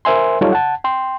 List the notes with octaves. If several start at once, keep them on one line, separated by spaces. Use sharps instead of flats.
A#4 C5 E5 G#5 C6
F#3 G3 D#4 F4 A4 C#5
F#5 A5
G5 C6